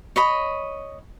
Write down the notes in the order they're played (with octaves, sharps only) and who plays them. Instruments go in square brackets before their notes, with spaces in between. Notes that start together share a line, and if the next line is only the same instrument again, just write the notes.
[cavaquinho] C#5 D#5 B5